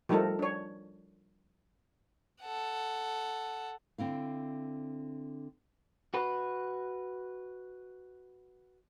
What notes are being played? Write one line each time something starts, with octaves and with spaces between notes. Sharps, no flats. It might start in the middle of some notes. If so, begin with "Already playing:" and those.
F3 G3 A3 D#4 A4 A#4
D4 C#5
A4 F#5
D3 C4 E4 F5
F#4 B4